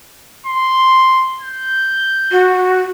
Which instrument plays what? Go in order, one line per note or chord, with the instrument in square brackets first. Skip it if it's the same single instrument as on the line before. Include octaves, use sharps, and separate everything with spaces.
[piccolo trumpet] C6
G6
[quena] F#4